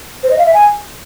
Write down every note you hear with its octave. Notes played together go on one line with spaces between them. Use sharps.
C5
D#5
F5
E5
G#5